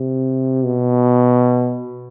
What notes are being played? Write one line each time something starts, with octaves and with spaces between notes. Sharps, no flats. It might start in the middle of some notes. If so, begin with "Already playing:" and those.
Already playing: C3
B2